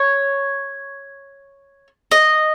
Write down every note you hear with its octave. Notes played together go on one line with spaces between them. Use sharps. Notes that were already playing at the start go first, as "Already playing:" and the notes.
Already playing: C#5
D#5